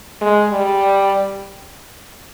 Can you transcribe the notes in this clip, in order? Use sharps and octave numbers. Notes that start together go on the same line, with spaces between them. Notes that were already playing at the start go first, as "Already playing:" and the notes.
G#3
G3